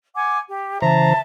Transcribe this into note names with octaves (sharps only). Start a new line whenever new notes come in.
F#5 G#5 D6
G4
C#3 E3 C5 E5 A5 A#5